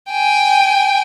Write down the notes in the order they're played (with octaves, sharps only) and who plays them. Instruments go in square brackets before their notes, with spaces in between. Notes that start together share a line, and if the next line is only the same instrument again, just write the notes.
[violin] G5 G#5